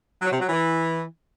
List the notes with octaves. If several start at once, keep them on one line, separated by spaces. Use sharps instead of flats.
F#3
C3
F#3
E3